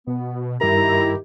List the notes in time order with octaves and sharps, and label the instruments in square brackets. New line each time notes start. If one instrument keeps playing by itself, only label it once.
[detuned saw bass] B2 [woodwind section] B3
[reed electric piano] G2 A#4 [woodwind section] D#3 G4 [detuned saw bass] E4 [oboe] A#5